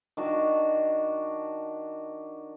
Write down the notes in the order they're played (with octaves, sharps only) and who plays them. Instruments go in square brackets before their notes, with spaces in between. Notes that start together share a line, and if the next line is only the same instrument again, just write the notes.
[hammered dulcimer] D#3 D4 F#4